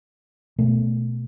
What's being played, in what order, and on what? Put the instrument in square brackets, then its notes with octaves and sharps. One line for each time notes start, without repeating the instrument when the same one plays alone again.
[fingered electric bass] B2 A3